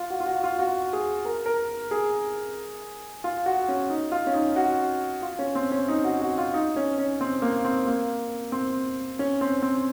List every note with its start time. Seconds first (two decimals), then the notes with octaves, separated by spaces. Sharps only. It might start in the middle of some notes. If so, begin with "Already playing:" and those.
Already playing: F4
0.10 F#4
0.20 F4
0.26 F#4
0.44 F4
0.59 F#4
0.93 G#4
1.25 A#4
1.46 A#4
1.91 G#4
3.24 F4
3.46 F#4
3.68 C#4
3.90 D#4
4.12 F4
4.27 C#4
4.34 D#4
4.56 F#4
5.22 F4
5.39 C#4
5.55 C4
5.72 C#4
5.88 D#4
6.04 F#4
6.22 F#4
6.38 F4
6.54 D#4
6.76 C#4
6.98 C#4
7.21 C4
7.42 A#3
7.65 C4
7.87 A#3
8.52 C4
9.19 C#4
9.41 C4
9.62 C4